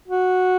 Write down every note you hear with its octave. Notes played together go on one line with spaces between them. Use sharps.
F#4